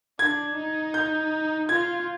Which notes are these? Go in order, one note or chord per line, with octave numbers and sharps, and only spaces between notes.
D4 G#6
D#4
G6
F4 G#6